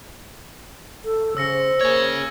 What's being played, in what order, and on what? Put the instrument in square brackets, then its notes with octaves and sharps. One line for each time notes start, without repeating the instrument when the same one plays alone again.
[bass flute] A4
[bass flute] C#3 [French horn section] C5 [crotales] E6 A#6 C#7
[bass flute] A#3 [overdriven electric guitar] G#4 C#5 [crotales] G#6